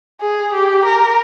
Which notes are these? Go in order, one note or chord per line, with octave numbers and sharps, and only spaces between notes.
G#4
G4
A#4